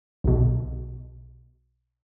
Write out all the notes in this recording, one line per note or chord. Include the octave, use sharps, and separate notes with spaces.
B1 B2